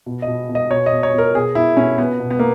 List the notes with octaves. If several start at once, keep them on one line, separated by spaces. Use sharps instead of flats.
B2
D#5
B2
B2
D#5
B2 C#5
D#5
B2
C#5
B2 A#4
B2 G#4
B2 E4
B2 C#4
B2 B3
B2
B3
A#3